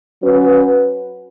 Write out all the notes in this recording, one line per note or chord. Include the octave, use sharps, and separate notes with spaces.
F#3 C#4 F#4 B4